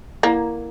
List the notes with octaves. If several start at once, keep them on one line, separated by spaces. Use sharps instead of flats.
A#3 E4 A4 D5 F#5 A#5